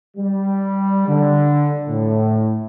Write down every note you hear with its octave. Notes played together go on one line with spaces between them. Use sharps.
G3
D3
A2